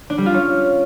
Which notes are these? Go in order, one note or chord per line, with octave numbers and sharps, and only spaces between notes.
D4
G3
F4
C#4